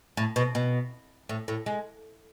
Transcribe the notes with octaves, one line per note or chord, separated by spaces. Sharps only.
A2
B2
B2
A2
A2
G#3